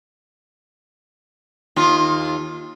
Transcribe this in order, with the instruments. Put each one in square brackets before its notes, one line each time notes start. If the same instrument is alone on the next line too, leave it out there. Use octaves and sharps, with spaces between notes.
[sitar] D#2 F4